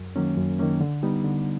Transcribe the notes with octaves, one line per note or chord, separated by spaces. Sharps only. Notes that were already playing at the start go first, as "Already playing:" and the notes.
Already playing: F#2
D#3 F#3 A#3 C#4
F#2
D#3 F#3 A#3 C#4
D3
G3 B3 D#4
D3